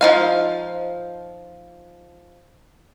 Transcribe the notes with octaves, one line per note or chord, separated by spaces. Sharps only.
F3 D#4 F5